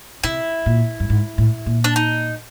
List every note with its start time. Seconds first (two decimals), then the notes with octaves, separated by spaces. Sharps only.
0.24 C3 E4
0.66 A#2
1.00 G2
1.10 G#2
1.38 A2
1.66 A#2
1.84 D4
1.96 D#4